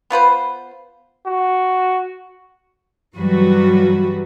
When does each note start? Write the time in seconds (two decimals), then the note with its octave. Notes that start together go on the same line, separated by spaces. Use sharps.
0.10 B3 F4 B4 C5
1.26 F#4
3.16 G2 E3 F#3 G3 F#4 B4